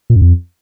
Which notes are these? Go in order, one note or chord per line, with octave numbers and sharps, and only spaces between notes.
A#2
F#2
F2